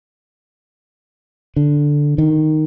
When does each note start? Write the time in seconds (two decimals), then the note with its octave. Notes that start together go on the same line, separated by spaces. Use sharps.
1.56 D3
2.18 D#3